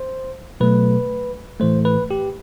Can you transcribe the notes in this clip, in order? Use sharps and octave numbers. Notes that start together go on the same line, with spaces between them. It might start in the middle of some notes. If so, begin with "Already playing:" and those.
Already playing: C5
B2 F#3 A3 B4
A2 E3 A3 C5
B4
G4